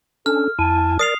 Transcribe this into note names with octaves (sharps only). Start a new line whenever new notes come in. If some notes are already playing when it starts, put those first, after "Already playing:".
C#4 D4 A4 F6
F2 E4 G#5 A5
A#4 D5 D#6 C7 F7